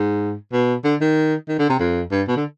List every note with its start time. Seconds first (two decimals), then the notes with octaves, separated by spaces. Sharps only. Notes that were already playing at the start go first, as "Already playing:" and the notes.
Already playing: G#2
0.52 B2
0.84 D3
1.01 D#3
1.48 D#3
1.59 D3
1.69 C3
1.79 F2
2.11 G2
2.28 B2
2.36 D3